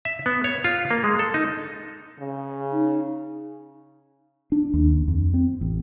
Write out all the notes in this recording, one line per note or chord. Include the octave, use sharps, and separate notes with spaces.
E5
B3
C#5
F4
A#3
G#3
A4
D#4
C#3
D#4
D4
D#2
F2
C4
A1